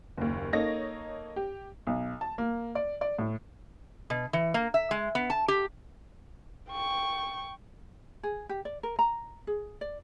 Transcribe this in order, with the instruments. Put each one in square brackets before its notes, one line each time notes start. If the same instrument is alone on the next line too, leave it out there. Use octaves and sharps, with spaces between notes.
[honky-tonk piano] F#1 D#2
A#3 D#4 A4 C#5 D#5 A#6
G4
[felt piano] B1
A5
A#3
D5
D5
A2
[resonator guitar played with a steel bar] B2
E3
A#3
E5
G#3
B3
A5
G4
[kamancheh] G5 C#6
[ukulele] G#4
G4
D5
A#4
A#5
G#4
D5